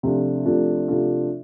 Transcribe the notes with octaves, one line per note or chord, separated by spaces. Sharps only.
C3 F3 A3 D4 F4
C3 F3 A3 D4 F4
C3 F3 A3 D4 F4